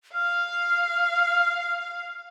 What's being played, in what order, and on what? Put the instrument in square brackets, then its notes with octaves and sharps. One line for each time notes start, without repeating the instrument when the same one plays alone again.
[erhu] F5 [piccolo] F6